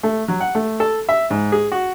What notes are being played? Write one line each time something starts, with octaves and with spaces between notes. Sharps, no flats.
A3
F#3
F#5
A3
A4
E5
G#2
G#4
F#4